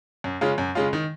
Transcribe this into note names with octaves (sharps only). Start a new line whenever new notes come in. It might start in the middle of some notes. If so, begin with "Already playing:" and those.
F#2
C#3 G#3 C#4 F4
F#2
C#3 G#3 C#4 F4
D#3